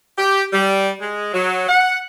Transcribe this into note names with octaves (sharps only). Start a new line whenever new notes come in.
G4
G3
G#3
F#3
F#5